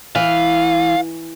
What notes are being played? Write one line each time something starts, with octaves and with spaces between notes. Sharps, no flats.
E3 F5